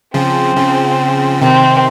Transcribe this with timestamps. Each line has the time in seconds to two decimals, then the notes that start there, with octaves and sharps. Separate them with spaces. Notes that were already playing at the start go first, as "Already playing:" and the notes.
0.14 C#3 F3 C4
0.57 C#3 F3
1.41 C3 D#3 C4